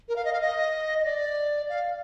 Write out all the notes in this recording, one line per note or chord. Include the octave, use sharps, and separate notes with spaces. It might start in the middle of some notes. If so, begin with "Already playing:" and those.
A#4
F5
D#5
F5
D#5
D#5
D5
F5